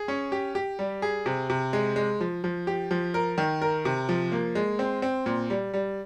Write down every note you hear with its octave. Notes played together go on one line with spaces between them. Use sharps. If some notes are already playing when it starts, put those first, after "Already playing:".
Already playing: G#4
C#4
G4
G4
G3
G#4
C3
C3
G#3
G#3
F3
F3
G4
F3
A#4
D#3
A#4
C3
F3
A#3
G#3
C4
C4
A#2
G3
G3